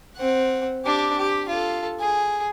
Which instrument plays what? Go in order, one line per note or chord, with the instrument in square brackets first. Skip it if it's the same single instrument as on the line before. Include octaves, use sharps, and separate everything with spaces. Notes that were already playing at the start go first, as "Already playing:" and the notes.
[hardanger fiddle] C4 F#5
D4 G4
G4
F4 A4
G#4